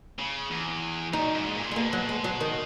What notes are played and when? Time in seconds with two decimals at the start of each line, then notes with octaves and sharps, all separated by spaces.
0.19 C#3
0.50 E2
1.13 F#2 D#4
1.35 G#2
1.56 A#2
1.71 G#3
1.76 B2 A#3
1.93 F#3
2.09 G#3
2.24 F#3
2.41 D#3